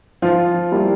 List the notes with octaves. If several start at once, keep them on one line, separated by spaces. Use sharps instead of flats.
F3 F4
G3 A#3 E4 G4